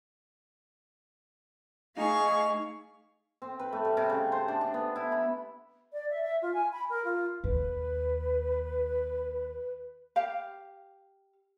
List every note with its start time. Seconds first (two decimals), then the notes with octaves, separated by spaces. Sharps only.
1.97 A3 D#4 G#4 F5 C#6
3.42 C4
3.59 B4
3.72 A3
3.85 G3
3.97 C3
4.10 C#3
4.32 C5
4.48 D4
4.61 D4
4.74 B3
4.96 E4
5.12 B5
5.93 D5
6.10 E5
6.23 E5
6.42 F4
6.54 G#5
6.72 B5
6.90 A#4
7.04 F4
7.44 D#2 B4
10.16 G4 F5